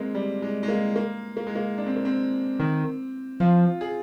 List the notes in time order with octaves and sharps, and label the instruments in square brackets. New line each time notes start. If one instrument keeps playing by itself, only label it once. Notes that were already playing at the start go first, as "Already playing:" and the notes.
Already playing: [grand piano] G#3 A#3 C4
G3
G#3
G#3
A#3
A#3
A#3
G#3
A#3
D4
C4
A#3
C4
[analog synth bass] D#3
[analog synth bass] F3 [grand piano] F4
[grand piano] G#4